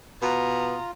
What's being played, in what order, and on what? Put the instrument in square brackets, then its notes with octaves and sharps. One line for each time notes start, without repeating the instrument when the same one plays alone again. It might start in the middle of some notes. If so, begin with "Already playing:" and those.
[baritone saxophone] B2 [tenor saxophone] B3 [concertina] F4 [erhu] A#5